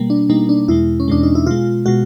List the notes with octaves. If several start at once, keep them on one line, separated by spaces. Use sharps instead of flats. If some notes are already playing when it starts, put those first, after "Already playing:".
Already playing: B2 G3 A#3
D4
B2 G3 A#3 D#4
D4
E2 B2 G#3 E4
C#4
E2 B2 G#3 D4
D#4
E4
B2 G#3 F4
B2 G#3 F#4